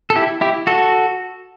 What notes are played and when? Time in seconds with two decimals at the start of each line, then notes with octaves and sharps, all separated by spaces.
0.10 A4
0.16 E4 G4
0.41 E4 G4
0.67 F#4 A4